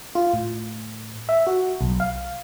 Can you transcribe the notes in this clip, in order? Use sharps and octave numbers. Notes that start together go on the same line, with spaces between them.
F4
A2
E5
F#4
B1
F5